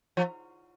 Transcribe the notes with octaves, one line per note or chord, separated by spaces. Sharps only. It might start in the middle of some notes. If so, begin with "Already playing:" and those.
F3